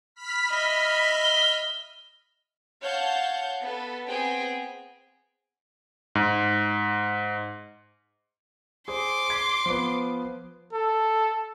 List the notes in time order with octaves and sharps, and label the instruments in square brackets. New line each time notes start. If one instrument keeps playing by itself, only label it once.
[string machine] B5 F6 B6
[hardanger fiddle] D#5 E5
[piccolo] G7
[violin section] C#5 F5 F#5 A5 G6
B3 A4
B3 C4 G#4 G5
[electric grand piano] G#2
[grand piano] G#4 C5 [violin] C6 D6
[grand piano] G#6 B6
F3 B3
[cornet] A4